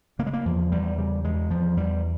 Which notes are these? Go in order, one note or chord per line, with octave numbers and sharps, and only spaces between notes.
C#3 A#3
G#3
A#3
E2 F3
E2 G3
C#3 G3
E2 G#3
E2 F3
E2 G3